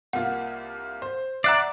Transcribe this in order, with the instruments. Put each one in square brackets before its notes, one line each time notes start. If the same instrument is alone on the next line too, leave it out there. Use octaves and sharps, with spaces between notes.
[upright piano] C2 A#3 F4 [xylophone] F#5
[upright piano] C5
[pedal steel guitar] D5 [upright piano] E5 F#5 D6 [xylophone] A#5 F#6 C7